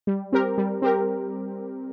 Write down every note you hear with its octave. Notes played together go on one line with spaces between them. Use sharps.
G3
C4 G4 A#4
G3
C4 G4 A#4